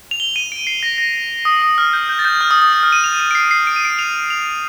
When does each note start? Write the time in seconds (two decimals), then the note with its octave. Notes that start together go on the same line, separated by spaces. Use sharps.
0.11 F7
0.20 G7
0.36 D#7
0.52 D7
0.67 C7
0.83 A#6
0.98 A#6
1.45 D#6
1.62 D#6
1.78 F6
1.93 G6
2.09 G6
2.19 A6
2.25 G6
2.41 F6
2.51 D#6
2.62 D#6
2.73 D#6
2.83 F6
2.92 D#7
3.04 F7
3.20 D#7
3.31 D7
3.35 C7
3.51 C7
3.67 D7
3.76 D#7
3.85 D7
3.99 F7
4.30 F7